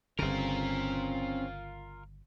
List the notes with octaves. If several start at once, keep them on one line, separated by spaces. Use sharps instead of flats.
G1 C#3 C4 C#4 F4 A#4